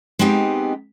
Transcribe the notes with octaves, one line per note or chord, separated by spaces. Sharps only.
G#3 B3 C4 D#4 G4